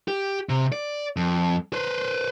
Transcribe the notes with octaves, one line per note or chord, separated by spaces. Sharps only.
G4
C3
D5
F2
B4 C5